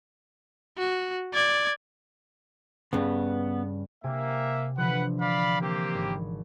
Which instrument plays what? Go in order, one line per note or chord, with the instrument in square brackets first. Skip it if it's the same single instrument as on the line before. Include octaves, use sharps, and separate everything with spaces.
[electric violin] F#4
D5 G#6
[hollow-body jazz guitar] G2 C#3 [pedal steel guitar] B3
[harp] C3 G4 G#5 [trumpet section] A#3 E5
[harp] D3 E3 F3 [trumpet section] B4 F#5
[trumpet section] D5 F5 B5
A#3 C4 G4
[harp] G#1